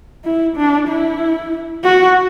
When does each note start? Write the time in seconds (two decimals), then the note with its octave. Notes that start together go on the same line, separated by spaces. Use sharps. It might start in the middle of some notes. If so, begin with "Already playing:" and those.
0.24 E4
0.57 D4
0.88 E4
1.84 F#4